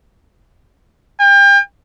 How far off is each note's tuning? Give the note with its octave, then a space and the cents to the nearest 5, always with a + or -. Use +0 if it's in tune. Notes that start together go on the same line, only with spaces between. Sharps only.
G5 +35